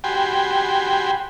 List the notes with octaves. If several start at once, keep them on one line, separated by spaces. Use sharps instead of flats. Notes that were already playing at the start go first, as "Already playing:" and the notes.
F#4 G4 G5 G#5 B5 C6